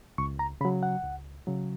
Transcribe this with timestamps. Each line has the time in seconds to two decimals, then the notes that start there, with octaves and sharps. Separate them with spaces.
0.18 C#2 C#6
0.39 A#5
0.61 C#3 B5
0.65 F#3
0.83 F#5
1.03 C#2
1.47 C#3 F#3